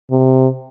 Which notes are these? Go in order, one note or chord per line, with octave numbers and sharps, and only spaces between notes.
C3